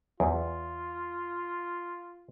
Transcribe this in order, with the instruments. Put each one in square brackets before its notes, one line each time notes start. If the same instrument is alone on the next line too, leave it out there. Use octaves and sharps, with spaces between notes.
[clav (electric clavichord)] E2 [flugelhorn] F4